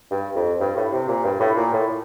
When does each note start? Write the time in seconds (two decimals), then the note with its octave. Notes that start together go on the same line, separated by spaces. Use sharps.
0.11 G2
0.35 F2
0.60 G2
0.76 A2
0.92 C3
1.09 A#2
1.24 G2
1.40 A2
1.57 A#2
1.73 A2